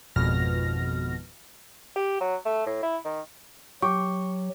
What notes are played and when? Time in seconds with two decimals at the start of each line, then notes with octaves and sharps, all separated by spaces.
0.16 G#1 F2 B2 F6 A#6
1.96 G4
2.20 F#3
2.45 A3
2.66 A2
2.83 E4
3.05 D#3
3.82 F#3 G4 C#6